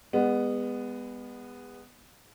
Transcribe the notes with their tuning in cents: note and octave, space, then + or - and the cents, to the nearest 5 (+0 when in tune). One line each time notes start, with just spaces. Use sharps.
G#3 -35 B3 +0